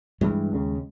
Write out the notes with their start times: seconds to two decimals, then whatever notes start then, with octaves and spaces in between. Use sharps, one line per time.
0.21 G2 E3 G#3
0.53 D#2 C#3